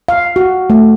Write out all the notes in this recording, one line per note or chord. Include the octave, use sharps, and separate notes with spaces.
F5
F#4
A3